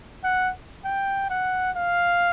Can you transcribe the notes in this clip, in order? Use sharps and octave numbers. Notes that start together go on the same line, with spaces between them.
F#5
G5
F#5
F5